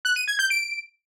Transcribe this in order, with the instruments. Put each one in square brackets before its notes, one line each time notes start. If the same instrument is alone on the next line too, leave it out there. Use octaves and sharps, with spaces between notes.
[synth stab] F#6
D#7
G#6
G6
D7